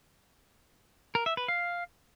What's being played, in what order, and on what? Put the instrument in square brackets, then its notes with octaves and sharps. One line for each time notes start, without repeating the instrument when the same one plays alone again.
[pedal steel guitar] A#4
E5
B4
F5